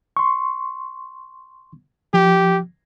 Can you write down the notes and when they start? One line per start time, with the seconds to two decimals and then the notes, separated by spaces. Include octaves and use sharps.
0.17 C6 C#6
2.14 F3 G4